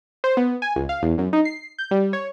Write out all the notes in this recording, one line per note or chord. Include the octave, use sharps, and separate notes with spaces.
C5
B3
G#5
C#2
F5
E2
F#2
D#4
C7
G6
G3
C#5